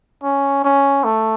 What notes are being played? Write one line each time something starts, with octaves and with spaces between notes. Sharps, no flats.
C#4
C#4
A3